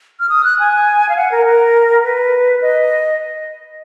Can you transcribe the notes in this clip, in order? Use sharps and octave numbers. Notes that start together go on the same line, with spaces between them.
F6
D#6
F#6
G#5
F5
F#5
A#4
A#4
B4
D#5